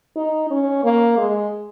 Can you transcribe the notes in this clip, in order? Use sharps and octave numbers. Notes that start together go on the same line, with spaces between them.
D#4
C#4
A#3
G#3